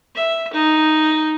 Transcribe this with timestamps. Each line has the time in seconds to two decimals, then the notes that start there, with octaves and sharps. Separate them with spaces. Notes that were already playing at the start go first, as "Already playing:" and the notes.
0.15 E5
0.53 D#4